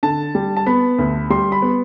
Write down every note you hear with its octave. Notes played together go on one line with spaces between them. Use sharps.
D3 A5
G3
A5
B3 B5
D2
G3 C6
B5
B3